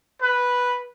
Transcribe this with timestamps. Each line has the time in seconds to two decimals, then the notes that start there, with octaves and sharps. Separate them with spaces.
0.22 B4